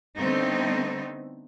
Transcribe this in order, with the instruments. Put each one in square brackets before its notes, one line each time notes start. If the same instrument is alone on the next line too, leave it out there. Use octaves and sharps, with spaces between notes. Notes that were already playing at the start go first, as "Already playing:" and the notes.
[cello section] D3 G3 A3 B3 C4 D#4